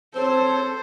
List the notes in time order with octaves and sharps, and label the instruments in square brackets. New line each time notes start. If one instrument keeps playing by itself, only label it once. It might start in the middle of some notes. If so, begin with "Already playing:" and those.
[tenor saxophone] C4 [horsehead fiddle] A4 [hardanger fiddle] C5 [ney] C#5